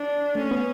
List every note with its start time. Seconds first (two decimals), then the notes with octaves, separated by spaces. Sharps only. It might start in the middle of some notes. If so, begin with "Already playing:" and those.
Already playing: D4
0.35 A3 C#4
0.51 B3